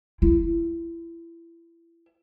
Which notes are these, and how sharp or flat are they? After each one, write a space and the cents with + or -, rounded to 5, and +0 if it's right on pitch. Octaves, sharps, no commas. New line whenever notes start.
E4 +25